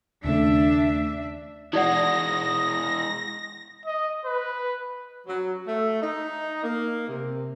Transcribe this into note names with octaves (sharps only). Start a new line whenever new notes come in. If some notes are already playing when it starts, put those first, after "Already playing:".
D#2 C#3 A3 D4 E5
E3 G#3 D#4 D5 F#5 D#6 A#6
D#5
B4
F#3
A3
D#4
A#3
C3